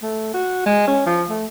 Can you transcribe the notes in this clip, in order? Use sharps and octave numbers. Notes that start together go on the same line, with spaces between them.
A3
F#4
G#3
C#4
F3
A3